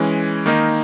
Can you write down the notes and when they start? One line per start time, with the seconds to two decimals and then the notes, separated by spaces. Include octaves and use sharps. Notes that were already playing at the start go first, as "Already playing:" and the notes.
Already playing: E3 G#3 C#4
0.46 D#3 A#3 D#4